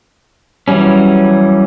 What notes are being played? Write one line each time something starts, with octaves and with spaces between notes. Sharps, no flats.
E3 F#3 G3 C#4